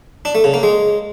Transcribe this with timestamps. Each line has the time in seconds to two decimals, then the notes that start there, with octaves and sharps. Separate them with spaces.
0.25 D4
0.35 A3
0.44 C#3
0.54 A#3
0.63 G#3